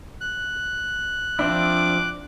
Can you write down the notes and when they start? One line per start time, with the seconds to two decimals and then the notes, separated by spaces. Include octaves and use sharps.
0.21 F#6
1.39 F3 C4 D4 E4 D6